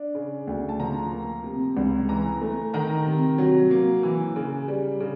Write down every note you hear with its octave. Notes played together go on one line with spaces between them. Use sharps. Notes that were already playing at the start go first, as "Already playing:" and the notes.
Already playing: D4
C#3
D2
A5
F3 A#5
A#3
C3
C#2
E3 A#5
A3
D#3 A#5
C3
F#3
A#3
E3
C#3
G3
C#3